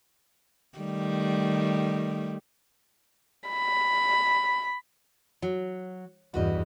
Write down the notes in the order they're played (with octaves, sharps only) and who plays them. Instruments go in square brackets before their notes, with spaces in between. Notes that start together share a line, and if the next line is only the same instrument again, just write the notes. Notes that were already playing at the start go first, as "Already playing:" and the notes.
[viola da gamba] D#3 G3 A3
[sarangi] B5
[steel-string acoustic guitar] F#3
[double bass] E2 G2 [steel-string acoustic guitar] F#4 B4 D#5